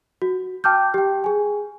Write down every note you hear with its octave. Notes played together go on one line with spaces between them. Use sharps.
F#4
G5 A5 D6 F6 G6
G4 G5
G#4 G#5